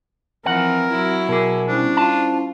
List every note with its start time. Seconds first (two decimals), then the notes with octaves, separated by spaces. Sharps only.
0.46 E3 F3 C4 A#4 F#5
0.90 F#3 E4
1.28 B2 G#4 A#4 D6
1.68 G3 C#4 D4 E4 C5
1.97 F4 A5